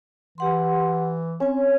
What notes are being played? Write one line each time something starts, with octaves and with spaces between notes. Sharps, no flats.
E3 G4 F#5 C6
C4 C#4 G#5